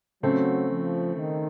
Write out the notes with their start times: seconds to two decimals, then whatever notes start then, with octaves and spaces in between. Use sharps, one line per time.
0.23 C#3 F#3 A3 C4
0.70 F3
1.16 D#3